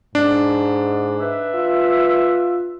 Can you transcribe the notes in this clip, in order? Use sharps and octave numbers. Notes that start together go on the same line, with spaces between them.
G#2 D4
B4 E5
F4